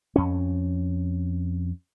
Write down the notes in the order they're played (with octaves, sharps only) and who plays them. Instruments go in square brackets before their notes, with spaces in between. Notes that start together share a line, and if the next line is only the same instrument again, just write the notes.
[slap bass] F2 C#4